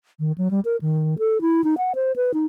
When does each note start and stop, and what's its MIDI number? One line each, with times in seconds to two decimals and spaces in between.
0.20 0.32 51
0.38 0.51 54
0.51 0.60 55
0.65 0.76 70
0.82 1.15 51
1.19 1.41 69
1.41 1.64 64
1.64 1.74 63
1.78 1.92 78
1.95 2.12 72
2.16 2.32 71
2.34 2.45 63